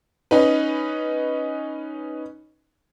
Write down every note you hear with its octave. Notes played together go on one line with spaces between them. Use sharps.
C#4 D#4 B4